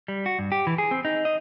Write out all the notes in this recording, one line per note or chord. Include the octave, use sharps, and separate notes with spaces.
G3
F#4
G2
G4
E3
G#4
C4
D#4
D#5